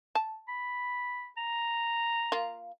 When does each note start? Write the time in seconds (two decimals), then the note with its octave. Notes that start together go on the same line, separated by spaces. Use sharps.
0.15 A5
0.48 B5
1.37 A#5
2.32 A#3 F4